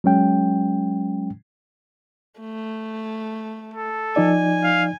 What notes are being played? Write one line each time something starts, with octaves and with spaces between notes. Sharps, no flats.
F#3 G#3 C#4 G5
A3
A4
F3 D#4 D5 G#5
F5